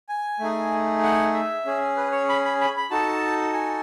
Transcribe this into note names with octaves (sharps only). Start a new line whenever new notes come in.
G#5
A3 D#4 G#4
F#5
E5
C#4 G#4
B4
C#5
B5
B5
B5
B5
D#4 F#4 A4 A5
G#5